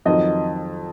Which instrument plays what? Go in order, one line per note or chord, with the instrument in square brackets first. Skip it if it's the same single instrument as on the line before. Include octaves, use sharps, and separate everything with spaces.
[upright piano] F2 D#3 F#3 [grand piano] D#5